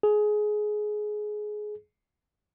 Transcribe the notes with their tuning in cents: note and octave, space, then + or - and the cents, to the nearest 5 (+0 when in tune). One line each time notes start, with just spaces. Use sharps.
G#4 +20